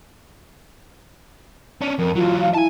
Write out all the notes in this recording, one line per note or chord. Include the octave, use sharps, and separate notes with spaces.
C#4 D4
F2 A#4
E3 F#3 F4
F5
E4 G#5 A5